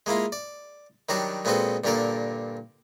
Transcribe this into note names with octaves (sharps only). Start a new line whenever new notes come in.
G#3 A#3 E4 F4
D5
D#3 F#3 G3 D4 F#4 D5
A#2 G#3 B3 C4 F#4 A4
G2 A#2 D3 A#3 A#4 D5